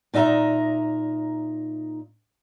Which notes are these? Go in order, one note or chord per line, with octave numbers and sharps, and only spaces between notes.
A#2 D#4 D#5 E5 A#5